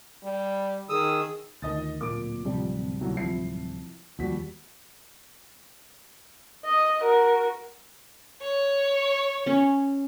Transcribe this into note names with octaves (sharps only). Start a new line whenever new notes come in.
G3
D#3 G#4 D#6 E6
D2 D#3 D#5 D#6 A6
D1 A#2 A#3 D6 D7
D1 C3 F3 G3
C2 A2 F#3
F3 E4 C7
D#2 F3 G3 F#4 B6
D#5
F#4 A#4
C#5
C#4 G#5